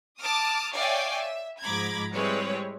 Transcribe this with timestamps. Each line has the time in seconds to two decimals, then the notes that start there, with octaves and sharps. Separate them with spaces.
0.20 A5 D6 D#6 F6
0.74 C#5 D5 E5 F5 G5 G#5
1.16 E5
1.61 G#2 F3 A#5 B5 D6 G#6
2.14 G3 G#3 C4 E4 B4 C#5